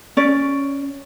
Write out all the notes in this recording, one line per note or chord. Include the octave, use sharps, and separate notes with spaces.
C#4 D5